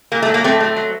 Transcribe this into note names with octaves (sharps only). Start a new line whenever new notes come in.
A#2 A#3
A3
F#3
A#3
A2 A3 C4
A3
F#3